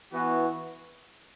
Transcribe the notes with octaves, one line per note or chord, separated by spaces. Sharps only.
E3 B3 F#4